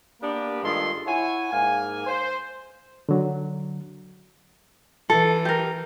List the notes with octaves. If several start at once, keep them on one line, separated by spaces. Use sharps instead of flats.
A#3 B3 D4 G4 A#4 B4
G2 D#3 G#3 F4 A4 C6
E4 C#5 F#5 G#5
G#2 A#3 F5 G#5
C5
D3 F#3
E3 A4
G4 A#4